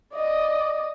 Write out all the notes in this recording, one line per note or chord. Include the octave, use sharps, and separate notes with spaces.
D5 D#5